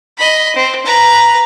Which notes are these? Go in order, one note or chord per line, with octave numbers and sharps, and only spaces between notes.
D#5 B5
C4
B4 A#5